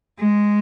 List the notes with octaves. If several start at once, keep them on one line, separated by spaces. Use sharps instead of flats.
G#3